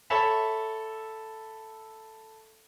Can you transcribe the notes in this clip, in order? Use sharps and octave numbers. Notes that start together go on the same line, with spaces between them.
A4 C#5 E5 A5 B5